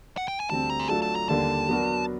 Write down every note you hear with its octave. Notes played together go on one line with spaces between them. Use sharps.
F#5
G5
G#5
D2 D3 G3 C4 A5
A#5
G#5
F#3 A3 D4 F4 A4 A5
A5
A#5
D#2 D3 G3 A#3 D4 A5
F#3 B3 D4 F#4 A#4